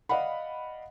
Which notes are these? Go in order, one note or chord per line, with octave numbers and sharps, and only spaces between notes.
D5 D#5 F5 F#5 B5